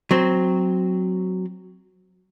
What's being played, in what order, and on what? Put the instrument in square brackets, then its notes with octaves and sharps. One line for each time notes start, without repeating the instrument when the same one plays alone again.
[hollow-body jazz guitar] F#3 C4